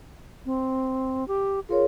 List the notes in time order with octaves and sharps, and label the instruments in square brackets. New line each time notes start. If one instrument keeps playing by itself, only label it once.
[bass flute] C4
G4
[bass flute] F4 [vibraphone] G#4 A#4 C#5